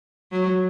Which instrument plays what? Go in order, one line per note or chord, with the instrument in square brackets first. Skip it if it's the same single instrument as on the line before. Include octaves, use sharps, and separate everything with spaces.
[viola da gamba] F#3